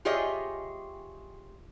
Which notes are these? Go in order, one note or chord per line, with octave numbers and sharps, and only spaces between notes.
F4 G4 G#4 C#5 D#5 E5